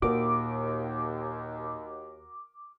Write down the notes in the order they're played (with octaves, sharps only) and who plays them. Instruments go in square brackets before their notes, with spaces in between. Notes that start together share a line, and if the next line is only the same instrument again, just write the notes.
[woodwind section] D#2 [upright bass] A#2 [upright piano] F#4 A#4 [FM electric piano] D6